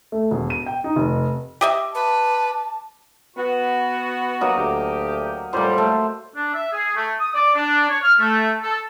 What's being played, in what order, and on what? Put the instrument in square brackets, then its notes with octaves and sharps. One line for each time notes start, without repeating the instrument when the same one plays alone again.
[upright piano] A3
E1
D#7
G5
D#4
F1
[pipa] G4 D#5 E5 [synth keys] D6
[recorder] B4 [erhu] A5
[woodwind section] B3 F#4
[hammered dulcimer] F#3 A#3 D#5
[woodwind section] D2 G4
[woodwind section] F2 A2 G3 [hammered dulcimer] A#3 C5
[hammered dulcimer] A3
[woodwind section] D4
E5
G#4
A3
D#6
D5
D4
C#5
F6
A3
A4